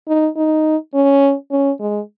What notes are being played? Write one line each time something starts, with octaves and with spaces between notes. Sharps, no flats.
D#4
D#4
C#4
C#4
G#3